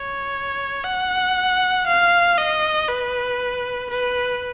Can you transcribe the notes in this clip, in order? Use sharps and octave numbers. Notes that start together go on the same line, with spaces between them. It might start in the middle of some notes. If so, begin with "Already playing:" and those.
Already playing: C#5
F#5
F5
D#5
B4
B4